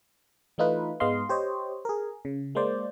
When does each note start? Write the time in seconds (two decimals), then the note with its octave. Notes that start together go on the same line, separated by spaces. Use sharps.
0.58 E3 A3 D#4 F4 B4
1.00 G#2 G#3 B3 D#5 F5 C6
1.29 G4 C5 C#5 D#5
1.85 G#4 A#4
2.25 C#3
2.55 G#3 A#3 C5 D5